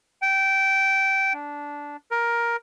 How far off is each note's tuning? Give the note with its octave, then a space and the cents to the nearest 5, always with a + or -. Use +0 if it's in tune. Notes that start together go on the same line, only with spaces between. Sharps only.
G5 -15
D4 -15
A#4 +10